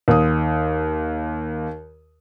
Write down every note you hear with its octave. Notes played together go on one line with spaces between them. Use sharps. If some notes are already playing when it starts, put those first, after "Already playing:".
D#2 D#6